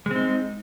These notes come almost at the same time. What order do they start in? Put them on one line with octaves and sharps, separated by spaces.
G#3 C4 D#4